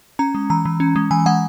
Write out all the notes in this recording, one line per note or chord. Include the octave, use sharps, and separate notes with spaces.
C#4 A#5
G#3
E3 A#5
E3
C#4
G#3
E3 G#5
G#3 F#5